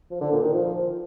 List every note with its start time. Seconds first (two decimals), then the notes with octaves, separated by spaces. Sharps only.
0.10 F3
0.21 D3
0.32 A#2
0.43 D#3
0.54 F3